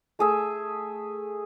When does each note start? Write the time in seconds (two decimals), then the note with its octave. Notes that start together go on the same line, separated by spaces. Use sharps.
0.19 A3 G#4 E5